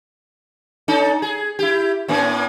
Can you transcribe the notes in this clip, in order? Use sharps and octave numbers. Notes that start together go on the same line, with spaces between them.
C#4 D#4 A4
G#4
E4 G4
A2 A#3 C#4